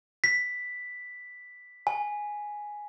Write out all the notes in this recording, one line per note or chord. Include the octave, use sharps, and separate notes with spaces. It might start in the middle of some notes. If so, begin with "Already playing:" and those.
B6
G#5